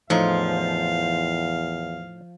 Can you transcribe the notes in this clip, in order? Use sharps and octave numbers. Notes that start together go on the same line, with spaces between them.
E2 A2 F3 D#4 F5